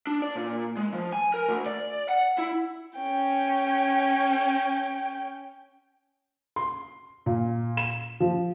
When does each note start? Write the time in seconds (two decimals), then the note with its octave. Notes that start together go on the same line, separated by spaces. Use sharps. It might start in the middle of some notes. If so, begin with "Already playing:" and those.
0.07 D4
0.22 D5
0.36 A#2
0.77 G#3
0.93 F3
1.13 G#5
1.34 A#4
1.49 D2
1.66 D5
2.09 F#5
2.38 E4
2.97 C#4 G5
6.56 C6
7.26 A#2
7.77 E7
8.20 F3